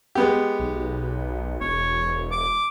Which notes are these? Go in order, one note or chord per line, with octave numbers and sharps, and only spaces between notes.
G#3 B3 G4
B1
E1 C#5
D6